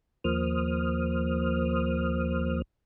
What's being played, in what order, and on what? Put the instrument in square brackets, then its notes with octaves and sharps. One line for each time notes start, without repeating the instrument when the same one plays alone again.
[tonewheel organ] D#2 F3 A#3 C5 D#6 F6